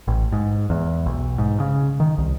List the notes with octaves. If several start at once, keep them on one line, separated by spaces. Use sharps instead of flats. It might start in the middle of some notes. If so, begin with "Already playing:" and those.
A1
G#2
E2
B1
G#2
C#3
D#3
C2